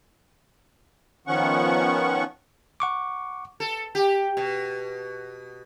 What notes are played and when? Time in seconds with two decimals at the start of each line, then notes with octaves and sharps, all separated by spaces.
1.27 D#3 F3 B3 C#4 F#5 C#6
2.80 F#5 C#6 D6
3.60 A4
3.95 G4
4.37 B2